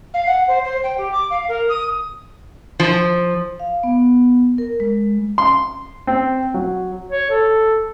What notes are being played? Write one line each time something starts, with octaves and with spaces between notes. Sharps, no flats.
F5
F#5
C5
C5
G5
G4
D6
F5
A#4
D#6
F3
F5
B3
A#4
G#3
C6
C4
F#3
C#5
A4